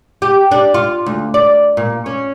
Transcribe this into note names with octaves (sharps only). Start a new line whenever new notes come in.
G4
D4
F4
D2
D5
A#2
C#4